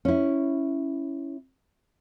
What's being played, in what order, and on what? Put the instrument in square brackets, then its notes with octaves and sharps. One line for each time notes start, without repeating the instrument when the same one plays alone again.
[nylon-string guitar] C#4 E4